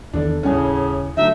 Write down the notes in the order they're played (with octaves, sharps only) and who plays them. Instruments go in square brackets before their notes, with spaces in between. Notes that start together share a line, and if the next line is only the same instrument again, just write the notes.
[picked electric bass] E2 D#3 B3 [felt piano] D4 A4 D5
[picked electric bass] D#1 G3 [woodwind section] A2 C#3 [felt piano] C#4 G#5
[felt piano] D3 F#3 A3 [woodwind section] D#4 [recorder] E5